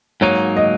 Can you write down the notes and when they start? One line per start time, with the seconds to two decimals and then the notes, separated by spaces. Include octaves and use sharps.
0.21 G#2 F#3 A#3 D#4 C#5
0.57 D#5